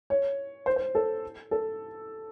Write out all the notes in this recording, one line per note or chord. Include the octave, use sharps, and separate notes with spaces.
C#5
C5
C5
A4
A4